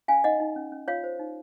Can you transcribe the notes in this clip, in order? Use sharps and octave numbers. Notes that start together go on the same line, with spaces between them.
C#4 F5 G#5
D#4 D#5 F#5
D#4
C#4
C#4
F4 C#5 F5
C5
D#4